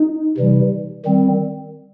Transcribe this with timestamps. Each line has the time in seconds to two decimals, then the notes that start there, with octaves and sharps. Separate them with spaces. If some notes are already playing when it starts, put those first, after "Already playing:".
Already playing: D#4
0.37 C3 E3 G3
1.05 D#3 G3 C4